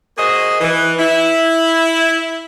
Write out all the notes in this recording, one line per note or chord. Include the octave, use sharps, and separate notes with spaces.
A#3 F#4 G#4 C5 D#5
E3
E4